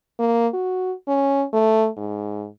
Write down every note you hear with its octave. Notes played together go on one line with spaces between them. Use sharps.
A#3
F#4
C#4
A3
G#2